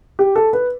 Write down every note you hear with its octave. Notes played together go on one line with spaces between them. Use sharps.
G4
A4
B4